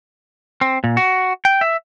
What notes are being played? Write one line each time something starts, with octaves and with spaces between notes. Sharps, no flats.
C4
A#2
F#4
G5
E5